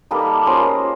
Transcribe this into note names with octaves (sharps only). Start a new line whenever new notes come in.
G3 A#3 D#4 A4 B4
G#3 C#4 F4 A#4 C5